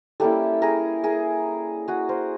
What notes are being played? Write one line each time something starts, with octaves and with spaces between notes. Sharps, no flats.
G3 A#3 C#4 E4 G4 A4
G#4 A#4
G#4 A#4
F#4 G#4
A#4 C5